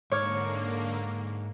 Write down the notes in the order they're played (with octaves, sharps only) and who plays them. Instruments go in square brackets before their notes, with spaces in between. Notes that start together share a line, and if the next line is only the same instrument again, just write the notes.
[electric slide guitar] G#2 [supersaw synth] D3 A#3 [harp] C#5 [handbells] C#6 D6 F6